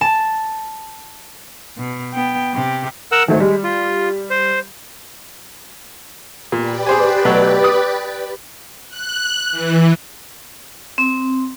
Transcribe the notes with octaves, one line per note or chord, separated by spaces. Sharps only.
A5
B2
B3 G5
C3 G4
A#4 F#5 E6
D#3 F#3 A3 C5
G3 G#3
F4
C5
A#2 G4 B4 D5
G#4 C5 G#5
B2 F#3 A3
D#6
F#6
E3
C4